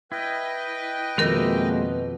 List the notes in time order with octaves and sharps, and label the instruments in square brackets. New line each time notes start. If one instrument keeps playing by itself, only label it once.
[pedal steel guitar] E4 [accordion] B4 D#5 G5
[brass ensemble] F2 B2 [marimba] D#3 A#4 [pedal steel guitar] G#3 A#3 E5